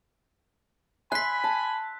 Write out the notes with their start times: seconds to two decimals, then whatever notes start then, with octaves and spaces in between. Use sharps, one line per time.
1.12 E5 G#5 B5 C6 F#6 B6
1.44 A5